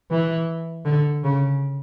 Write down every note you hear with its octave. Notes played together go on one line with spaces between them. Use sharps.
E3
D3
C#3